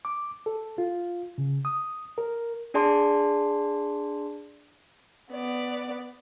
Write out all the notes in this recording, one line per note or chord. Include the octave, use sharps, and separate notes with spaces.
D6
A4
F4
C#3
D#6
A#4
D4 G#4 D5 A5 C6
B3 D5